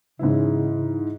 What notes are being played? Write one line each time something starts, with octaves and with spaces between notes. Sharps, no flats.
G#2 C#3 E3 E4